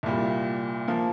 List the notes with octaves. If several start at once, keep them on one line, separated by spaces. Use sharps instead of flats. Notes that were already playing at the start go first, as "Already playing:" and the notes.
C2 A#2 G3
F3 A#3